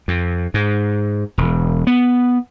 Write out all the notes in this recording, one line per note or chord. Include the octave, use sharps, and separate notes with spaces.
F2
G#2
E1
B3